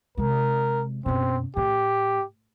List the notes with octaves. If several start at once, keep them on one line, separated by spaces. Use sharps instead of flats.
C3 G#3 A#4
F#2 B2 C4
A2 G4